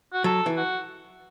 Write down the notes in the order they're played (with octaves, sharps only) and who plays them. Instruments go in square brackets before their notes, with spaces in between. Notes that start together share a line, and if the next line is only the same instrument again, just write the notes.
[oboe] F#4
[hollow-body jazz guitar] F#3 [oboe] A4
[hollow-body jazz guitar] E3
[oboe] F#4